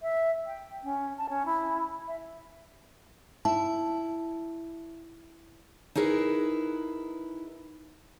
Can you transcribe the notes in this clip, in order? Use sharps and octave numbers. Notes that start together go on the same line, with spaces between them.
E5
G5
C#4
A5
C#4
E4
E5
E4 A5
D#4 E4 G#4 A#4 B4